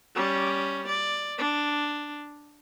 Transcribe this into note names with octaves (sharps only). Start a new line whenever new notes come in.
G3 C#4
D5
D4